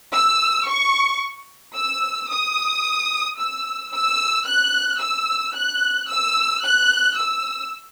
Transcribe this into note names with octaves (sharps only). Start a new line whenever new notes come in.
E6
C#6
E6
D#6
E6
E6
F#6
E6
F#6
E6
F#6
E6